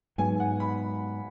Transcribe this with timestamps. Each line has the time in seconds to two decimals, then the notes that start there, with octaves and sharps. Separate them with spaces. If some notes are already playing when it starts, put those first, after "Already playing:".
0.18 G#2 F#3 B3 G#5
0.40 F#5
0.60 B5